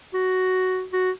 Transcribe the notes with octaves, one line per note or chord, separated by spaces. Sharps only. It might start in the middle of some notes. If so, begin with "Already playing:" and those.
F#4
F#4